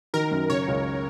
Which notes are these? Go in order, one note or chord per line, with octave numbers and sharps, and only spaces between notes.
D#3 A#4
F#2
C#3 C#5
C#2